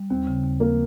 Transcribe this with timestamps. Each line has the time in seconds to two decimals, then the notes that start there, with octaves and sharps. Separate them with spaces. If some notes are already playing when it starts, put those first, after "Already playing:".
Already playing: G3
0.10 D#2 C4
0.27 C#3
0.44 D#2
0.60 F3 A#3